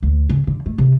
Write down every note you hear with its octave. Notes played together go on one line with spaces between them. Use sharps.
D2
C#3
D3
A3
C3